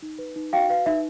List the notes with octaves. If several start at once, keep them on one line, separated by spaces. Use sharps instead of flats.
D#4
B4
D#4
F#4 F5 G5
B4 F5
D#4 E5